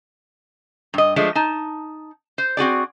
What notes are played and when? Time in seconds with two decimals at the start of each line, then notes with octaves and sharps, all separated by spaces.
0.94 G2 D#5
1.16 F3 G#3 A3 D4
1.35 D#4 A5
2.38 C5
2.57 C4 F#4 G#4 D5